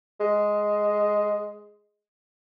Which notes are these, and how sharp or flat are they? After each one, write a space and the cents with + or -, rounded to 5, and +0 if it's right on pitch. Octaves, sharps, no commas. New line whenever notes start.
G#3 +5